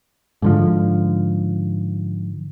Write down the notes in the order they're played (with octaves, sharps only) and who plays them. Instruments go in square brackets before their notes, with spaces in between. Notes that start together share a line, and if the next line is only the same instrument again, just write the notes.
[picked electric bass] G#2 D3 F3